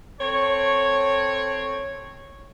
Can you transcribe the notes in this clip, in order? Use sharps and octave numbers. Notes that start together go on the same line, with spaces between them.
C4 A4 C#5